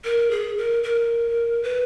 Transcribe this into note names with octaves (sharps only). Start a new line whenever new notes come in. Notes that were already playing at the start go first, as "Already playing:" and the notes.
A#4
G#4
A#4
A#4
B4